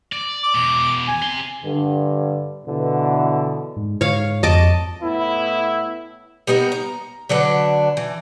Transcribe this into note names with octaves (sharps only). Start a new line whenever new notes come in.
D5
D6
E2 B2
G#5
C3 C6
G2 D3
B2 D3 E3
G#2
G#2 C#5 F5
F2 D#5 A5 D6
A2 B3 E4
G3 B3 D#4 A#4
A#5
D3 F#3 D4 B4
E3